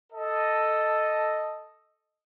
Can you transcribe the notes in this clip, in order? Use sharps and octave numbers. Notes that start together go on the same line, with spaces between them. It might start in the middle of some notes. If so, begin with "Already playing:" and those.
A4 D#5